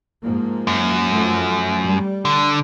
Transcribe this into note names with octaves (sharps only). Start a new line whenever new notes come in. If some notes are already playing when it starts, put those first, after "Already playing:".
G#2 F3 A#3
F#2
F3 A3
G3
D3